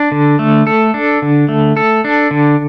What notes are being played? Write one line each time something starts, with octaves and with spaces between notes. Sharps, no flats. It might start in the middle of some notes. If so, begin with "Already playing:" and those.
Already playing: D4
D3
A3
A4
D4
D3
A3
A4
D4
D3